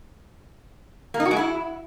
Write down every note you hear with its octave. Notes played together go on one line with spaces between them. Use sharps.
A#3
D#4
F#4
G#3
E4